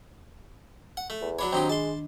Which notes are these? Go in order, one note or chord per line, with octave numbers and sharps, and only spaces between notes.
F#5
A3
E2
F#3 D4 C#5 B5
D#3 F#3 C4 D4 D#4 G4
G#3 A5 C6